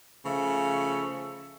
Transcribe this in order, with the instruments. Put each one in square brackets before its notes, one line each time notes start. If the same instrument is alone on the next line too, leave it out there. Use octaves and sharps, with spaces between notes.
[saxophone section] C#3 F3 A3